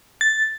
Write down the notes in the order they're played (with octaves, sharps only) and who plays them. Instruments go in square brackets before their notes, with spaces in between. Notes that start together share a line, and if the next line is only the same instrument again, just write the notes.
[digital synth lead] A6